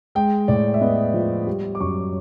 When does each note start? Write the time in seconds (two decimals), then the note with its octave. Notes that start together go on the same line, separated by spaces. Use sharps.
0.15 G#3 G5
0.48 A2 D5
0.74 E5
0.81 B3 D#5
1.14 F3
1.47 G3
1.75 D6
1.80 F#2 C#6